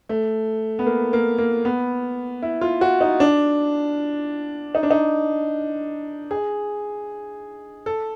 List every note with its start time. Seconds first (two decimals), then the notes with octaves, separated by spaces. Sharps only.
0.09 A3
0.79 B3
0.86 A#3
1.13 A#3
1.38 A#3
1.65 B3
2.42 E4
2.61 F4
2.81 F#4
3.01 D#4
3.20 D4
4.75 D#4
4.83 D4
4.91 D#4
6.31 G#4
7.86 A4